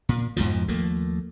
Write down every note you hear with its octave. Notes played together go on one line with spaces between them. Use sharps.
A#2
F2 G#2 B2 F3
D#2 F3 A3 A#3